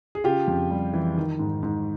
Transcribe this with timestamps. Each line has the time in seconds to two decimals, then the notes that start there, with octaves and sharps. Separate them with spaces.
0.15 G#4
0.24 C#3 F4 G4
0.48 F2
0.71 G3
0.93 E3
1.17 D#3
1.39 G#2
1.63 G#2